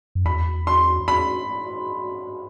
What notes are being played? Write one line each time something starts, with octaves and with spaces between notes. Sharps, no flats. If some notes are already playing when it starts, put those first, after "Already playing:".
F#2
E2 B5
C6
B5